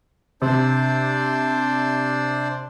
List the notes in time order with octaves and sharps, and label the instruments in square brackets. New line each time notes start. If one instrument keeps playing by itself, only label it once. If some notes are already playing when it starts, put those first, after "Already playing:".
[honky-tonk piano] C3 [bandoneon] D4 C5 D5